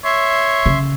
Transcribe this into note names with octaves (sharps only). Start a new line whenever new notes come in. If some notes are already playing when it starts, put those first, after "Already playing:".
C#5 E5 C6
C#3